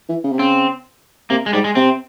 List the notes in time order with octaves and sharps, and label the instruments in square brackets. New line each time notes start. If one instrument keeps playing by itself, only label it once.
[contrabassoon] E3
C#3
C3
[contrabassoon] C#3 [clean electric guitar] C4
[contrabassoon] C3 [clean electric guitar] A#3
[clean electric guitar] G#3
[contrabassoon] G#2 [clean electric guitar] G3
[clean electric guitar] G#3
[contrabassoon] C3 [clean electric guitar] C4